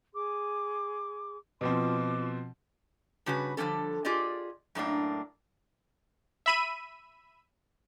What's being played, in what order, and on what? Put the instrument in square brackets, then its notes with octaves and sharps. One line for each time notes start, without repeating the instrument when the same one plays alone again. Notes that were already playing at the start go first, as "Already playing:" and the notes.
[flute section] G#4 C6 D6
[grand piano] B2 F3 C4 [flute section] F4 C6 D6
[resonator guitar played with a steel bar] G2 C#3 F#4 B4
D3 F3 G3 C#4 A4
F4 G4 G#4 D5 D#5
F#2 A2 A#3 D4
[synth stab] E5 B5 D#7